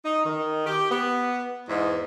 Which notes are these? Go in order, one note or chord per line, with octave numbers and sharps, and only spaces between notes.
D#4
D#3
G4
B3
E2 G#2